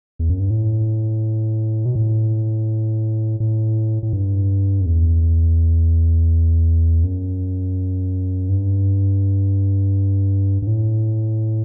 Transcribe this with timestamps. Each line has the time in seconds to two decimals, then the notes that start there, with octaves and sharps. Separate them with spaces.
0.19 E2
0.29 F#2
0.40 G2
0.50 A2
1.86 B2
1.95 A2
3.40 A2
4.03 A2
4.13 G2
4.81 F#2
4.86 E2
7.04 F#2
8.49 G2
10.62 G2
10.67 A2